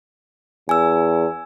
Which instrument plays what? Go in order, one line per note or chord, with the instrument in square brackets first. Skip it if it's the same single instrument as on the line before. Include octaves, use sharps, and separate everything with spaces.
[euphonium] E2 [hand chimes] G#5 E6